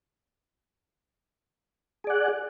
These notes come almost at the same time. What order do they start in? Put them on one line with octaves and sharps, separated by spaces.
G#4 D5 F#5